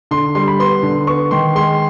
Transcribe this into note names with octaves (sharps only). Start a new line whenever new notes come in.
D3 C6
G3 C6
B5
B3 C6
D3
B3 C#6
D#3 C6
G#3 C6